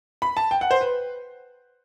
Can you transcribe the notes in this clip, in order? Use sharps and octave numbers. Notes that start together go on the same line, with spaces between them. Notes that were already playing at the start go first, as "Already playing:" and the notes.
B5
A5
G5
F#5
C5
B4